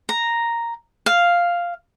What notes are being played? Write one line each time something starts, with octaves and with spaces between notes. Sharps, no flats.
A#5
F5